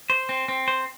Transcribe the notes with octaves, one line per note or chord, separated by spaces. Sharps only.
C5
C4
C4
C5